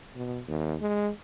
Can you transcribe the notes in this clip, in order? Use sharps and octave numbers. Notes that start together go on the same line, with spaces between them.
B2
D#2
G#3